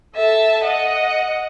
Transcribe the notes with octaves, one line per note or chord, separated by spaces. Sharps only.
A4 E5 A5
D#5 F#5